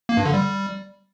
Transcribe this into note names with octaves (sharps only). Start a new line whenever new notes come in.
A#3
G2
D3
G3